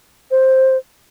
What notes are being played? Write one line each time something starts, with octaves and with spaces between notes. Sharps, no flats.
C5